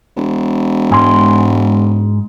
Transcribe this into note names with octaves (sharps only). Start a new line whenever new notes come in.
E1
G#2 G#5 C6